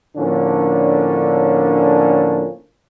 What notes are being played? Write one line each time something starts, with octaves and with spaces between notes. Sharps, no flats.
A2 D3 F3 A#3 C#4 D4